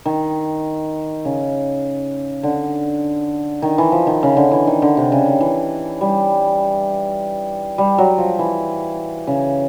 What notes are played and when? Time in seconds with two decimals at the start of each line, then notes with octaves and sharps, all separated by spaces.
0.06 D#3
1.25 C#3
2.43 D3
3.62 D#3
3.78 E3
3.92 F3
4.07 D#3
4.23 C#3
4.37 D3
4.51 E3
4.67 D#3
4.82 D3
4.97 C3
5.12 C#3
5.26 D#3
5.40 E3
6.01 G3
7.78 G3
7.98 F#3
8.18 F3
8.39 E3
9.27 C#3